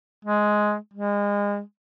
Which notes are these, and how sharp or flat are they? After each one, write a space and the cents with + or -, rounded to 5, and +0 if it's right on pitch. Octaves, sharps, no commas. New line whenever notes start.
G#3 +10
G#3 -30